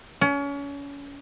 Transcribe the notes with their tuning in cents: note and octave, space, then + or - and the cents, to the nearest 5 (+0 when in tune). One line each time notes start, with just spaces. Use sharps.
C#4 +30